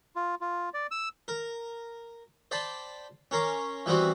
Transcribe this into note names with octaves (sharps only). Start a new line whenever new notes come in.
F4
F4
D5
E6
A#4
C5 D5 G5 A5 B5
C#4 A#4 C6 D6
E3 G3 B3 C4 F#4